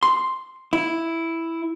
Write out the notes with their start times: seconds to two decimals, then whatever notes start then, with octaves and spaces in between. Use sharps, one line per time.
0.03 C6
0.73 E4